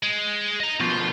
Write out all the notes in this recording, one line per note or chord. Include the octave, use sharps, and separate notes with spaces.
G#3
D#5 A#5
B2 F3 F4